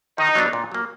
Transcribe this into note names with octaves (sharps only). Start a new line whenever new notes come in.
D#3 D#4
F#3 B3 D4
A#2
F#3 A#3